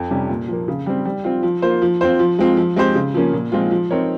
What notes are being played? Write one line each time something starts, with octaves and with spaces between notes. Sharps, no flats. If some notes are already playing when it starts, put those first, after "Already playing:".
Already playing: F2
C3 G3 C#4 G4
A#2
F3 A#3
C#3
G3 C4
G3
C4 F4
F3
A#3 F4 C5
F3
C4 F4 C5
F3
G#3 C4 F4
F3
G#3 C4 G4 C5
C#3
F3 A#3 C#4
A#2
F3 G#3 C4 F4
F3
C4 D#4 A#4 C#5